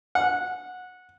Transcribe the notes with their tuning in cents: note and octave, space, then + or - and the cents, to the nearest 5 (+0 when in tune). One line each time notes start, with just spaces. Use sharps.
F#5 -15